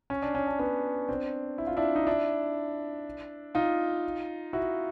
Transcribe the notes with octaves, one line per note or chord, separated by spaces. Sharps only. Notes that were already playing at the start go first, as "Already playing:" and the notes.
C#4
D4
C#4
D4
B3 C#4
C4 D4
E4
F4
D4 E4
D#4
D4 E4
D#4 F4
E4 F#4